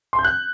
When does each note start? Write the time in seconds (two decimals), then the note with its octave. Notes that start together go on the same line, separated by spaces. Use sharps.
0.13 C6
0.19 G6
0.24 F#6